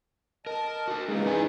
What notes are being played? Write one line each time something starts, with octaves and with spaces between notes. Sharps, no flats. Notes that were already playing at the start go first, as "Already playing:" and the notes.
A#4 D#5 A5
F#4 A4
E3 G#3 A#3 C#4 D#4 G#4
E4 D5 G#5